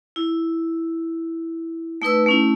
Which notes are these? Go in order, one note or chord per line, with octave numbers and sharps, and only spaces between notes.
E4
A3 D#4 B4 E6
A3 C#4 E4